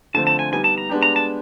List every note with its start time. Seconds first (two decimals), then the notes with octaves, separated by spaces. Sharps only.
0.14 D3 F3 A3 C4 A5
0.27 A5
0.39 G#5
0.52 G3 B3 D#4 G#5
0.64 A5
0.78 A#5
0.89 G#3 B3 D4 G4
1.03 A#5
1.16 A5